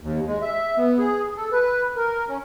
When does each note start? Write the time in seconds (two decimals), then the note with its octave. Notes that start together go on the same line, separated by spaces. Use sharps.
0.01 D#2
0.27 G#3
0.42 E5
0.77 B3
0.98 G#4
1.36 A4
1.52 B4
1.96 A#4
2.29 C#4